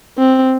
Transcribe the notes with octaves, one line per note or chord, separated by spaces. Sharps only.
C4